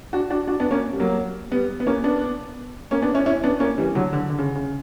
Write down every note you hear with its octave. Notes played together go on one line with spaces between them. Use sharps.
D4 F#4
D4 F#4
D4 F#4
B3 D4
A#3 C#4
G3
F#3 A#3
G3 B3
B3
A#3 C#4
B3 D4
A#3 C#4
B3 D4
C#4 E4
C#4 E4
B3 D4
A#3 C#4
E3 G3
D3 F#3
D3
D3
C#3
C#3